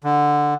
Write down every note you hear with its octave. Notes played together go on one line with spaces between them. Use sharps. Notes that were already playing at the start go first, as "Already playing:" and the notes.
D3